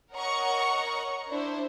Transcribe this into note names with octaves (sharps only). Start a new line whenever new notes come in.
A#4 C#5 D#5 F#5 A#5 C#6
D4 E4 C5